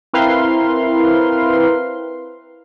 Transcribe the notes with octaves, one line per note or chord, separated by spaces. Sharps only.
C4 E4 A#4 B4 F5 C6